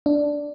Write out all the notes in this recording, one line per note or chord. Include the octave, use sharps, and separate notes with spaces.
D4